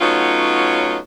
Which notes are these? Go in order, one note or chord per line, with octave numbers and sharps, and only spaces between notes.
F#3 A3 B3 C#4 D#4 F4